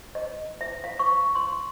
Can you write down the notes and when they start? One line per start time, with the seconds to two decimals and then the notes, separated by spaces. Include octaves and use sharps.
0.15 D#5
0.61 E5
0.84 F5
0.99 C#6
1.35 C6